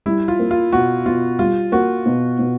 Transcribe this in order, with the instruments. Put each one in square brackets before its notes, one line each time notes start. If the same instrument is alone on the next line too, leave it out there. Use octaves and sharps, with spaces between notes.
[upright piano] G3 [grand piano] E4
[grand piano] F4
[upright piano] A#3
[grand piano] F4
[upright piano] B2 [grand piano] F#4
[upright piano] B2 [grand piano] F4
[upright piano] G3 [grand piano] F4
[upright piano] A#3 [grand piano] F#4
[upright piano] B2
B2